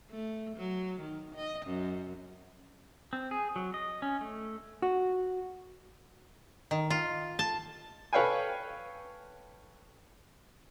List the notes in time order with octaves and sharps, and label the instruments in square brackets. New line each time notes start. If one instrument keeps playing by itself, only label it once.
[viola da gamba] A3
F#3
D#3
D#5
F#2
[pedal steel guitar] C4
G#4
F#3
D#5
C#4
A3
[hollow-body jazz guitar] F#4
[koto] D#3
F4
A5
[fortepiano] A4 B4 C#5 F5 G5 G#5